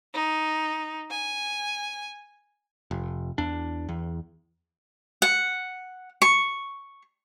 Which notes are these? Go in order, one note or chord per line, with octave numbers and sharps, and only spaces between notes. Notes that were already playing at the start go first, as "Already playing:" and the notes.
D#4
G#5
F1
E2 D4
E2
F#5
C#6